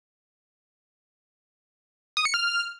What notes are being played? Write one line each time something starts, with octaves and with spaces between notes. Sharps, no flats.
D#6
C#7
F6